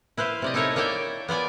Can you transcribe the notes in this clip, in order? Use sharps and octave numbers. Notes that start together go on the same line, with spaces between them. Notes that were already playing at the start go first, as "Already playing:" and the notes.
E4 B4 C5 F5
C3 D5 D#5
D#4 E4 A4 A#4 C#5 D#5
A#3 C#5 D5 E5 G5
B3 F4 D5 G#5